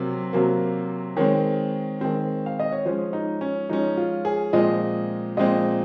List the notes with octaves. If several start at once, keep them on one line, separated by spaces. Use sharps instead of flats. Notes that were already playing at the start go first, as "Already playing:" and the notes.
Already playing: C3 F#3 A#3
C3 F#3 A#3
D#3 G#3 C4 C#5
D#3 G#3 C4
F5
D#5
C#5
F3 G#3 C#4 C5
D#4
C#4
F3 G#3 C#4 D#4
F4
G#4
A#2 F3 G#3 C4 D#5
A#2 F3 G#3 C4 D#5